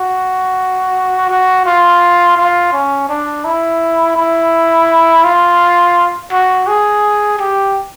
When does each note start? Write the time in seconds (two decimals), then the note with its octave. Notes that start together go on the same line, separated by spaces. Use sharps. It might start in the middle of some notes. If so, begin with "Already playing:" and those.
Already playing: F#4
1.30 F#4
1.66 F4
2.37 F4
2.73 C#4
3.09 D4
3.45 E4
4.17 E4
5.24 F4
6.32 F#4
6.67 G#4
7.39 G4